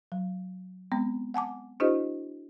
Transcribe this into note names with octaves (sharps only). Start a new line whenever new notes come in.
F#3
G#3 B3 C4
F#5 G#5 A5 D6
D4 E4 F#4 G#4 C5 D#5